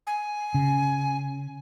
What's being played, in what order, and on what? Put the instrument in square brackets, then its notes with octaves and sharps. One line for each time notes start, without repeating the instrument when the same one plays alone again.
[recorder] G#5
[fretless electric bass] C#3